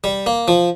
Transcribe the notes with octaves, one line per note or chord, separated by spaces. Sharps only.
G3
A#3
F3